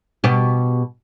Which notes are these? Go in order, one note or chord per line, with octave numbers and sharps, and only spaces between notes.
B2 G4